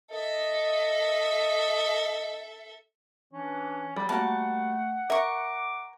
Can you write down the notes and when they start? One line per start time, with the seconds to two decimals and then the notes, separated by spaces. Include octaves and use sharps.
0.11 A4 D#5 E5
3.33 E3 C#4 D4
3.96 F#3 G3 G4
4.09 G3 A3 A#3 F#4 F#5 A5
5.10 A#4 E5 C#6 D6